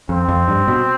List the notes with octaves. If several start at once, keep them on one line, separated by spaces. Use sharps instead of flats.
F2 C4
F2
G2
B2